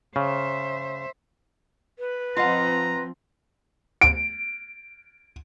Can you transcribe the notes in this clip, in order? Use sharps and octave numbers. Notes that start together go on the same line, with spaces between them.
C#3 C5 E5
B4
F3 C4 F4 D#5 F#5 A#5
D7